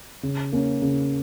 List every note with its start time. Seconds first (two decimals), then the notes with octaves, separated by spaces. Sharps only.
0.23 C#3
0.53 A#3 C#4
0.82 C#3